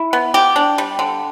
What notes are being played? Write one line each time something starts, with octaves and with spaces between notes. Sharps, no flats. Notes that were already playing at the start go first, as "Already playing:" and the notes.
Already playing: E4
B3
G4
D4
G3
D3